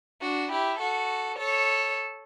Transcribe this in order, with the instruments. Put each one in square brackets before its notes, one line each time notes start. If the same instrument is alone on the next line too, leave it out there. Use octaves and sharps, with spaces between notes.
[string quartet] D4 F#4
E4 G4
F#4 A4
A4 C#5